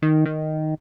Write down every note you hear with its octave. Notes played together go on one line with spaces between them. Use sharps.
D#3
D#3